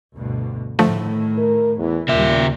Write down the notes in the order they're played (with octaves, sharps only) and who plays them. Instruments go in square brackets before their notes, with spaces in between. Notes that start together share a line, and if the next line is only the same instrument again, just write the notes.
[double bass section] D2 G2 B2
[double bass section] A2 D#3 [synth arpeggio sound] D3 F3 A3
[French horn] A#4
[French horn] E2 [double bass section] E3
[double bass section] D#2 G3 [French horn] A#2 [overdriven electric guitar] C#3 E5